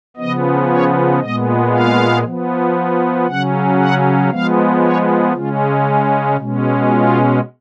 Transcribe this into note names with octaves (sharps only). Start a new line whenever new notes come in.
C#3 F3 B3 D#5
C#5
A#2 G#3 B3 D#5
F5
F3 B3
C#3 F#3 C#4 F#5
F#5
F3 G#3 B3 F5
C#5
C#3 G#3 C#4 F4
B2 G#3 C#4
F4